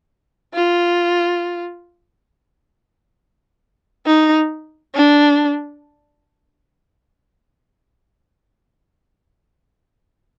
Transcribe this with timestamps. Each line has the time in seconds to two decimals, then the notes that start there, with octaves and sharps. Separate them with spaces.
0.55 F4
4.06 D#4
4.95 D4